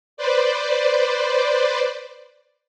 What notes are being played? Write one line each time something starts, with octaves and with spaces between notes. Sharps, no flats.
B4 C5 D5